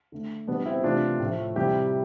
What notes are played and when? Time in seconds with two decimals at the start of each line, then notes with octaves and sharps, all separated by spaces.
0.12 D3 A3
0.47 B2 G3 B3 D4
0.66 C4 E4
0.83 C3 E3 A3 D4 F4
1.20 A2 F3 A3
1.56 C3 G3 E4 G4